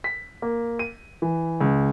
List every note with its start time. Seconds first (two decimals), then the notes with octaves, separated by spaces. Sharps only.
0.04 B6
0.42 A#3
0.79 D#7
1.22 E3
1.61 C#2